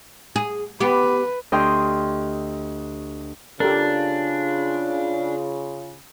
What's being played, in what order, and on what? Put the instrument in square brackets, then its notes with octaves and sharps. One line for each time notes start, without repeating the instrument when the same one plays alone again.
[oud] G#4
[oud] B3 G4 [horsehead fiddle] B4
[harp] D2 G4 D#5 G5 C6 F6
[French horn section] C#3 F4 [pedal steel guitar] D4 [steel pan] G4 A4 A#4